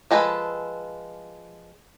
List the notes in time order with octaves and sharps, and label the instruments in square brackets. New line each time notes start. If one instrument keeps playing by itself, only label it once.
[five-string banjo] F3 G#3 A4 B4